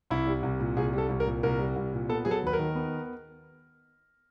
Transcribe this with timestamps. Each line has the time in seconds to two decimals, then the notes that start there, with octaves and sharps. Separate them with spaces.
0.10 C2 E4
0.27 G3
0.43 C2
0.60 A#2
0.77 C2 G#4
0.93 G3 A4
1.09 C2
1.20 A#4
1.26 A#2
1.43 C2 A#4
1.59 G3
1.76 C2
1.93 A#2
2.09 B3 A4
2.25 F#3 G#4
2.31 A4
2.42 D#2 B4
2.53 A#4
2.59 D#3
2.75 B3